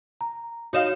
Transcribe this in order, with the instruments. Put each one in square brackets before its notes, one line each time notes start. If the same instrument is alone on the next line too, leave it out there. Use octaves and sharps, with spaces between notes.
[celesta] A#5
[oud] D#4 D#5 F5 [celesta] F#4 C#5 E7